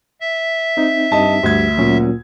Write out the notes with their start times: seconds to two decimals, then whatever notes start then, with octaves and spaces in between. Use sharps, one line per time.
0.21 E5
0.77 C4 D#4
1.12 G2 D#5 A5
1.43 D2 G2 G#6
1.78 A#2 F#3 C#4